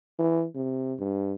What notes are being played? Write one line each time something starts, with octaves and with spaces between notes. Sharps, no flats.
E3
C3
G2